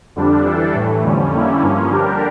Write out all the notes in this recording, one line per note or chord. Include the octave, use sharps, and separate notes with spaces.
F2 D3 G3 D4
E3 G3 D4 A4
A2 E3 A3
F2 D3 G3 C#4
D3 G3 A#3 C#4 E4
G2 F3 A#3 C#4
D3 G3 D4 G4 A#4